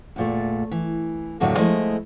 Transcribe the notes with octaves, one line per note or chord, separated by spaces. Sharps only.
E2 A#2 A3
E3
D#2 A2 D3 F#3 A3 A#3
F3 G#3 A3 E4 D#5